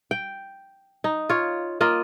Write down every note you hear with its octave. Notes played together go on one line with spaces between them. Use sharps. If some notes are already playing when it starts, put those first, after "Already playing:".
G5
D#4
F4 C#5
A#3 F4 D#5